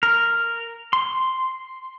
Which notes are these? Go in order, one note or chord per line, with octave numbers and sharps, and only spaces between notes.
A#4
C6